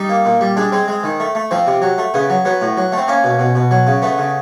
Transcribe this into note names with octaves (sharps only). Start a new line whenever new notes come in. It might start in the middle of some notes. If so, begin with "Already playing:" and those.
Already playing: G3 D#4
A#3
A#2
G3
G#3 D4
G#3 C4
G#3
D#3
A3
A3
F3 C4
C3
F#3
A3
C#3 B3
F#3
F#3 B3
A2
F#3
A3 C4
A#3 C#4
B2
B2
B2
F#3
C#3
A3 B3
C#3